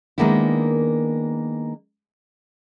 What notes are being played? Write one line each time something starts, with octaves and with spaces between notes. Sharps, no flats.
D#3 G#3 A#3 B3 D4 E4